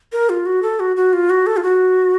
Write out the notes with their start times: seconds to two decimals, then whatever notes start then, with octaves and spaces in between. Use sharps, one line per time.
0.12 A#4
0.29 F4
0.46 F#4
0.63 A4
0.80 F#4
0.97 F#4
1.13 F4
1.30 F#4
1.47 A4
1.57 F4
1.63 F#4